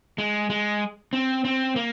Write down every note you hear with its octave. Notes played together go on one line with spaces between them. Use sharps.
G#3
G#3
C4
C4
A#3